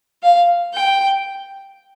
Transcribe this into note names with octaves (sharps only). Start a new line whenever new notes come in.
F5
G5